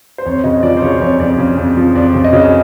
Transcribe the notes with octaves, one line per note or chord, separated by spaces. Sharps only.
C5
F2 C#5
C#3 D#5
F3 D5
C5
C#3 C#5
F2 C#5
F2 D5
C#3
F2
F3
F2 D5
C#3
D#5
C#3